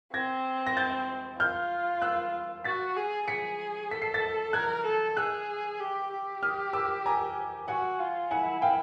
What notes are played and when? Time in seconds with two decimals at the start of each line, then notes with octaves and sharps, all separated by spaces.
0.13 C4 G#6 A#6
0.67 A#6
0.77 G6 A6
1.39 F4 F6 G6
2.02 E6 F#6
2.64 F#4 A6 B6
2.96 G#4
3.27 G#4 B6 C#7
3.91 A4 B6
4.02 C7
4.14 A6 B6
4.53 A#4 F#6 G#6
4.86 A4
5.17 G#4 E6 F#6
5.80 G4
6.11 G4
6.43 D#6 F6
6.73 D6 E6
7.06 G#5 A#5
7.68 F#4 F#5 G#5
7.99 F4
8.31 E4 F#5 G#5
8.62 F5 G5